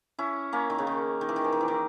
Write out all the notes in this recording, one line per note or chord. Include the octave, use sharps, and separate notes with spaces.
C#4 E4
A#3 C#4
D#3
C#3
D#3
D#3
E3
D#3
E3
D#3
E3
D#3